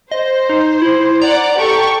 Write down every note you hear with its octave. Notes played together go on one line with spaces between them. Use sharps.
C5 D#5
D#4
E4
D5 F#5 A#5
G4 A4 C#6